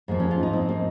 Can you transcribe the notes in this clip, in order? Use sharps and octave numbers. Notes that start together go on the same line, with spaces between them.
G#2 F3 A#3
C#4
F4
D#4
C4
A#3